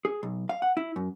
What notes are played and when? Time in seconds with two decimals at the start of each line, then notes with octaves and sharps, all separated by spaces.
0.05 G#4
0.23 B1
0.49 F5
0.62 F#5
0.77 E4
0.96 F#2